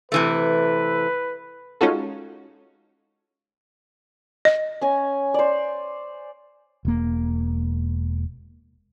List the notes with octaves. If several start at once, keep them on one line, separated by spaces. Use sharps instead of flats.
C3 E3 A3 B4
G#3 C#4 D#4 F4 F#4 A4
D#5
C#4 G#5
C5 D5
E1 A#3